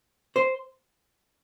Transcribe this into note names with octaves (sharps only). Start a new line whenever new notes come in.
C5